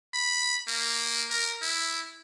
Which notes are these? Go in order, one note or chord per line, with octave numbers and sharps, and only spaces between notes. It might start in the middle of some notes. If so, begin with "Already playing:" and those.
B5
A#3
A#4
E4